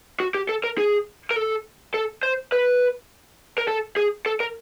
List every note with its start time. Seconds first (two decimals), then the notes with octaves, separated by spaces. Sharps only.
0.20 F#4
0.35 G4
0.49 A4
0.64 A#4
0.78 G#4
1.31 A#4
1.36 A4
1.94 A4
2.23 C5
2.52 B4
3.58 A#4
3.68 A4
3.96 G#4
4.26 A4
4.40 A#4